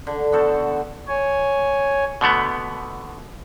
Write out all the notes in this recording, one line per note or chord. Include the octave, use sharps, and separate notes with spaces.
D3
B3 F#4 A4 C5
C#5 G#5
B2 D3 A3 B3